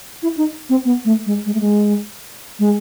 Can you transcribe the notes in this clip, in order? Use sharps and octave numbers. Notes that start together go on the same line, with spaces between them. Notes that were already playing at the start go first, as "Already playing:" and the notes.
E4
D#4
C4
B3
A3
G#3
G#3
A3
G#3
G#3